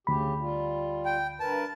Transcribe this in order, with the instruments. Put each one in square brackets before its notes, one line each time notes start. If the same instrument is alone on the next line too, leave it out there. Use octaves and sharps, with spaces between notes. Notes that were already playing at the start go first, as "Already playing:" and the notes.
[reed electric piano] D2 B5 [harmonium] C#3 G4
[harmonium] G3 F4
[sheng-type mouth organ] G5
[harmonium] G2 A#4 B4 [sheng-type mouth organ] A5